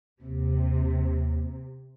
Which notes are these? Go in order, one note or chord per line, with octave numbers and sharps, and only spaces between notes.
D#2 C3